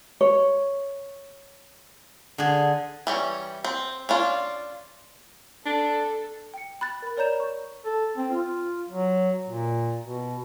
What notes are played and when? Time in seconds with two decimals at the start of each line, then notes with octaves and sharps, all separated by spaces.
0.21 C#5
2.38 D3 G#4
3.07 E3 G3 C#4
3.64 C4
4.09 C#4 D4 F4
5.66 D4 A4
6.54 G5 C#7
6.81 B5 F#6 A6
7.02 A#4 B5
7.17 A#4 C#5 D5 A#5 G6 E7
7.40 C#6
7.85 A4
8.17 C4
8.31 F4
8.90 F#3
9.48 A#2
10.02 B2